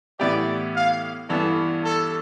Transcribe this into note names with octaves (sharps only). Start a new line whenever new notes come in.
A2 E3 B3 E4 G4 D5
F5
G2 E3 B3 A4
A4